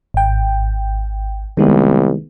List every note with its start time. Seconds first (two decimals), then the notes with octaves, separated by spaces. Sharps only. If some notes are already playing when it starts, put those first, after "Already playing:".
0.14 G#1 G5
1.57 C2 D#3 G#3 B3